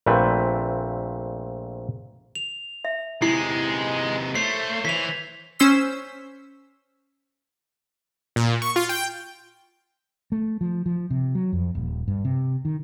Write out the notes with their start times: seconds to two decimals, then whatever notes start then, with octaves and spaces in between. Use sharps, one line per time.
0.06 A#1 A#2 A3 C4 B4 E5
2.35 F7
2.85 E5
3.22 C3 G#3 D#4 E4 C7
4.35 A3 C5 C#5 C7
4.85 E3 B6 F7
5.59 C#4 C5 E6 B6
8.36 A#2
8.62 C#6
8.76 F4
8.89 G5
10.32 A3
10.61 F3
10.86 F3
11.10 C3
11.35 F#3
11.53 F2
11.75 D#1
12.08 G2
12.25 C3
12.65 D#3